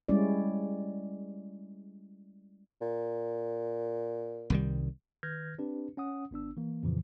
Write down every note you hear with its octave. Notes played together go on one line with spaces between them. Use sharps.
G3 G#3 C#4 E4 D5
A#2
C2 D#3 G3
D#3 B4 F6 G6 G#6 A#6
C4 D4 G4 B4
C#4 F#5 D#6
G#1 B3 D4 E6
E3 A#3
F2 A#2 C#3 E3 F3